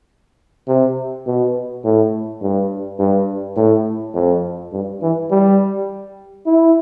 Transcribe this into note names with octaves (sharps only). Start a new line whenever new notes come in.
C3
B2
A2
G2
G2
A2
F2
G2
E3
G3
E4